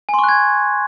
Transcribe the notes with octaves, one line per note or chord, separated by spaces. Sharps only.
G#5 C6 C#6 F#6 G#6